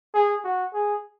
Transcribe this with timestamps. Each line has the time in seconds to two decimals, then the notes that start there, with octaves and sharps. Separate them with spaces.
0.14 G#4
0.44 F#4
0.74 G#4